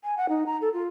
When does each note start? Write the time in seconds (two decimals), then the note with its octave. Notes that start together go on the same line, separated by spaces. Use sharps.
0.04 G#5
0.17 F#5
0.29 D#4
0.46 A#5
0.61 A4
0.73 F4